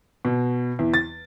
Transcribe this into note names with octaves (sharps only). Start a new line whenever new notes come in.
B2
E2
A6